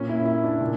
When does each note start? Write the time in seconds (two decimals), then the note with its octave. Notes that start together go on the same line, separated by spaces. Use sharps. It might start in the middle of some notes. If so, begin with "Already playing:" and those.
Already playing: A#2 A#3 C#4
0.09 E4
0.26 E4
0.44 D4
0.61 A#2